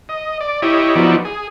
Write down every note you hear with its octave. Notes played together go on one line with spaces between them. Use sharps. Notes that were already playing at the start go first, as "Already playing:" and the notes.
D#5
D5
E4 G4 C#5 D#5
F3 B3 D#4 E4 F#4 D5
G#4